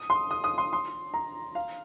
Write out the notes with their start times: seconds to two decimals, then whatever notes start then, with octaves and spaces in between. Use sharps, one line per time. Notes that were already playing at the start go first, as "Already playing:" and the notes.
Already playing: D#6
0.10 C6
0.31 D#6
0.44 D#6
0.58 C6
0.73 C6
1.14 A#5
1.55 F5